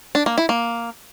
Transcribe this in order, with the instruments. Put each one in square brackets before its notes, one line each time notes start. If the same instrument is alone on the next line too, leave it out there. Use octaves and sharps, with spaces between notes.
[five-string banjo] D4
A#3
E4
A#3